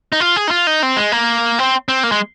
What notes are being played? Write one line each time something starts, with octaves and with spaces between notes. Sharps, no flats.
D#4
F4
G#4
D#4
F4
D#4
C4
G#3
A#3
C4
C4
A#3
G#3